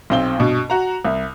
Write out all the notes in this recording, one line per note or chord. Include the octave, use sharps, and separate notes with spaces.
B1 C4 G7
G2 B2
F#4 A#5
C2